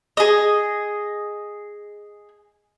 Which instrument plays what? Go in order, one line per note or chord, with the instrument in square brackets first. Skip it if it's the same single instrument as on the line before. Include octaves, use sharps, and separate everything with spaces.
[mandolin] G#4 D#5